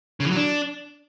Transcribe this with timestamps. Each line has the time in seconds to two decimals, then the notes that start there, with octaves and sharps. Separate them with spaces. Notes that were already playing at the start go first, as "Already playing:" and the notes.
0.20 C#3
0.25 E3
0.30 F#3
0.36 D4